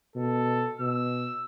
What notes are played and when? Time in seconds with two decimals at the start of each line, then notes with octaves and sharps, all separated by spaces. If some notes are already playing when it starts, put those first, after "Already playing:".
0.16 B2 A4
0.80 B2 E6